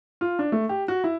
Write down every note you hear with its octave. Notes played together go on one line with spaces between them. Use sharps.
F4
D4
A3
G4
F#4
E4